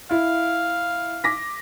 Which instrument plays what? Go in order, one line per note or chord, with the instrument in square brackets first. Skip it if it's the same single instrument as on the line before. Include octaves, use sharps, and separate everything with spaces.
[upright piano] E4 [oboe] F5
[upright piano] D6 A#6 B6